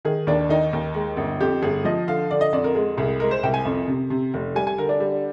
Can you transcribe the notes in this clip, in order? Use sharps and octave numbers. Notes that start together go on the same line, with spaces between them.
D#3 G#4
D#2 D4
D#3 D#4
D#2
G#3
G1
F2 G4
G1 G#4
F3 D#5
D3 F5
D3 D5
D#5
F2 D5
A#4
G#3 G#4
C2 G#4
G#3 A#4
C5
C2 G5
G#5
F2
C3
C3
F1
G3 G#5
G#5
D3 A#4
D4
G3